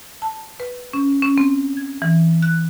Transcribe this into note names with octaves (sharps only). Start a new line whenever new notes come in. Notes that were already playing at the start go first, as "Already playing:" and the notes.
A5
B4
C#4
C#4
C4
G#6
E3
F#6